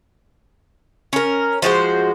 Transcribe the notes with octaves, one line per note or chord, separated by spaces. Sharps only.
C#4 A#4
F3 G#3 F#4 C5